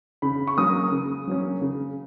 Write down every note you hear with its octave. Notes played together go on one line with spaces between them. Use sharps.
C#3 B5
C#6
F#3 A#3 C#4 D#6
C#3
F#3 A#3 C#4
C#3